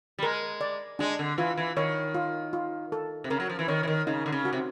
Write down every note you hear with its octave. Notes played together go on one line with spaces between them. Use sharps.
G3
G#3 A#4
D5
G#3 D4
D3
E3 F4
E3
D#3 C#5
F4
F4
A4
C3
C#3 A#4
F#3
F3
E3
D#3 C#5
E3
D#3
C#3 D#4
D3
C#3
F#4
C3